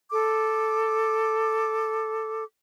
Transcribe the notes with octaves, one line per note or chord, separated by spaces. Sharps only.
A4 D6